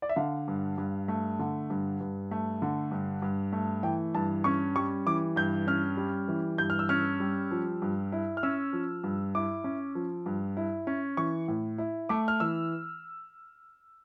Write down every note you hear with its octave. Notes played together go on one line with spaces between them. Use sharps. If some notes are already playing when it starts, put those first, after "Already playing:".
D5
E5
D3 F5
G2
G2
A3
D3
G2
G2
A3
D3
G2
G2
A3
E3 G5
G2 A5
C#4 C#6
G3 C#6
E3 D6
G2 G6
C#4 F6
G3
E3
G2 G6
F6
E6
C#4 F6
G3
F3
G2
E4
F6
C#4 E6
F3
G2
E4 D6
C#4
F3
G2
E4
C#4
E3 C#6
A2
E4
A3 D6
F6
E3 E6